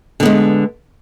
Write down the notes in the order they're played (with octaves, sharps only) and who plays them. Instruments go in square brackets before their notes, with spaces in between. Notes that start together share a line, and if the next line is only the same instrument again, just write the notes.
[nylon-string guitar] D3
B3
G#3